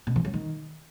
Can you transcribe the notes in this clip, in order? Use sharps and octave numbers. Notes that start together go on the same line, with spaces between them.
B2
E3
F#3
D#3